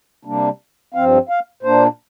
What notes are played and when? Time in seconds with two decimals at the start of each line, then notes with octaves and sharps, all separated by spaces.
0.25 C3 G3 A#3 D4
0.94 G2 F3 C4 F5
1.29 F5
1.63 A#2 A#3 D4 C5